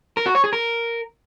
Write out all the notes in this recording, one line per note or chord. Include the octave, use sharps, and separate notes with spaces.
A#4
F#4
C#5
G#4
A#4